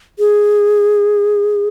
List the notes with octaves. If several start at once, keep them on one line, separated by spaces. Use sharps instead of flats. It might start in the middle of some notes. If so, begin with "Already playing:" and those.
G#4